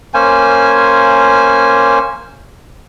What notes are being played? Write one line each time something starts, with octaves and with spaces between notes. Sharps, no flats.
A#3 C#4 C5 G#5